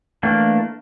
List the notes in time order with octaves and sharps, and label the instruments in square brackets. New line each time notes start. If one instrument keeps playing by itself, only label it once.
[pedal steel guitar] E3 A3 A#3 D4